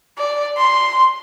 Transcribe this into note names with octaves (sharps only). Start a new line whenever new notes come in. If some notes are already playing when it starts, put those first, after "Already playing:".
D5
C6